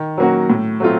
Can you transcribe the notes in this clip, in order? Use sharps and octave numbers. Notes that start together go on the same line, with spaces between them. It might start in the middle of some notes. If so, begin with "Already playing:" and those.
Already playing: D#3
F#3 A#3 C#4 F#4
A2
F#3 A3 C4 F4